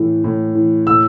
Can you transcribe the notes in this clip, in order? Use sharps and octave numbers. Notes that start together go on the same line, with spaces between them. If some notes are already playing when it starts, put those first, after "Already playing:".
Already playing: A2 E3
A2
E3
A2 E6